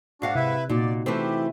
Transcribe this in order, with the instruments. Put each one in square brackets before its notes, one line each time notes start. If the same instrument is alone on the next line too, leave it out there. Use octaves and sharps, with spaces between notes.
[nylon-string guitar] G#2 F5 F#5 [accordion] D4 F#4
[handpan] C3 [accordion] E4 B4 E5
[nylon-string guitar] A#2 [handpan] D#4 F#4 [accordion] D5
[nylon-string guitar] E3 A3 C4 [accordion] G4